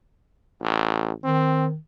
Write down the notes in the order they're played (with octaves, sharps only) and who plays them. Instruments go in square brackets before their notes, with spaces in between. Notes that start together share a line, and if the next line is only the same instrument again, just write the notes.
[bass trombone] A1
[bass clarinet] D#3 [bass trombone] C4